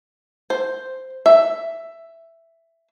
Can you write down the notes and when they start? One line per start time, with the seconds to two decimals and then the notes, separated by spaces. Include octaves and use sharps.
0.50 C5
1.26 E5